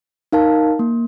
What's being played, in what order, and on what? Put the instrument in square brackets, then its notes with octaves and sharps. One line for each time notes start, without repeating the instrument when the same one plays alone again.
[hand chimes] D#4 A#4 F5 A5
A#3